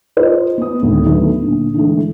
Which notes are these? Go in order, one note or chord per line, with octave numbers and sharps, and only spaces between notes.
F4 C5 D#5
B3 D#6
D2 A2 D#3
D3 D#3 F#3 A3 B3
A#2 D3
D3 E3 G#3 A3